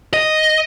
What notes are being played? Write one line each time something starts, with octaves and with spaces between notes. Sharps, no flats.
D#5